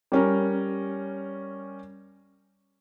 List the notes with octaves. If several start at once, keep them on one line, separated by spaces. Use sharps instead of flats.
G3 C#4 A#4